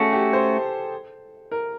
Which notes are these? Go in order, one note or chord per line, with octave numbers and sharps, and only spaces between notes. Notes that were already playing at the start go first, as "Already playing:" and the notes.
Already playing: A3 C#4 F#4 G#4 A4
G4
C5
A#4